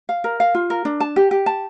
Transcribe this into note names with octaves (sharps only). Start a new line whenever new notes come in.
F5
A#4
F5
F4
A#4
D4
A5
G4
G4
A5